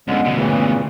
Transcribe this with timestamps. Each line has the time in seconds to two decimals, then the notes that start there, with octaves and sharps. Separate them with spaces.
0.08 C#2 B2 D3 G#3
0.25 D2 B2
0.37 A#2 C#3 E3